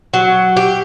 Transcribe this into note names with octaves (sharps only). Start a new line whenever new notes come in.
F#3
G4